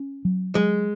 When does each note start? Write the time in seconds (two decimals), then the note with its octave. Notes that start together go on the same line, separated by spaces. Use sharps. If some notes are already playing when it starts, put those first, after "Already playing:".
Already playing: C#4
0.25 F#3
0.55 F#3 G#3